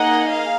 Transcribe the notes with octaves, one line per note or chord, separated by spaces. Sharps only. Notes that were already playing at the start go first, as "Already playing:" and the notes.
Already playing: A#3 D#4 G#4 D#5 F#5
F5